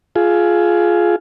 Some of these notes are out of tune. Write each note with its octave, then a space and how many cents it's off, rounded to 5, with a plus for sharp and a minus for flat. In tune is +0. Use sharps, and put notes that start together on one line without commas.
F4 +0 G#4 +15